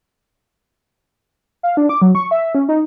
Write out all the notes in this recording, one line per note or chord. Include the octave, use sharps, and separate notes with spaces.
F5
D4
D6
F#3
C#6
E5
C#4
D#4